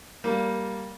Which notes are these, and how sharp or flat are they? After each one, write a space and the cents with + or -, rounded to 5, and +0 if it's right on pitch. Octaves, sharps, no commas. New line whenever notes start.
G3 -10 A#3 -5